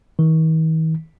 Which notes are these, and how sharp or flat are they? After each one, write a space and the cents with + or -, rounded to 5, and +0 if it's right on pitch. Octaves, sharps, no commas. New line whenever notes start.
D#3 +45